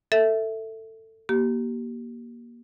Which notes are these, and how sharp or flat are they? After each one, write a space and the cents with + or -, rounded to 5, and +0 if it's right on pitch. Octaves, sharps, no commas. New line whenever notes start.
A4 +20 E5 -5
A#3 +25 G4 -25